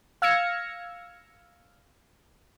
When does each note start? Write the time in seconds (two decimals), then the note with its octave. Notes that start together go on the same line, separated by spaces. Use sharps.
0.22 F5 E6 F6 G#6 A#6 C#7